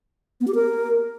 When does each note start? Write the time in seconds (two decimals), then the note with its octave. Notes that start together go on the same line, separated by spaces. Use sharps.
0.41 B3
0.48 G4
0.55 A#4